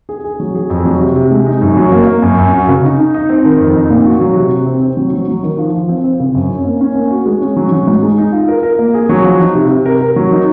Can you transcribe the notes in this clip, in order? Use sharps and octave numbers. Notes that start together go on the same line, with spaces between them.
G#4
G#4
F#3
G#4
F2
F#3
C3
C3
G#3
D#4
F#2
F#3
A#3
A#3
F#2
F#2
F#4
C#3
D#4
D#4
D#4
C4
D#3
F2
D#4
A#2
F#4
F#3
C3
C3
C4
C4
F#3
F#3
F#3
D#3
F3
F3
C4
C4
C#3
F#2
C#4
A#3
C#4
A#3
F#4
G#3
C#4
F#3
F#3
G#2
G#3
D#4
F4
A#4
A#4
A#3
G#4
F#3
F3
D#4
C3
C3
A#4
A#4
F#3
D#4